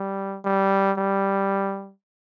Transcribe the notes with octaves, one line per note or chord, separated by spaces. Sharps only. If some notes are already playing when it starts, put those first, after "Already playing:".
Already playing: G3
G3
G3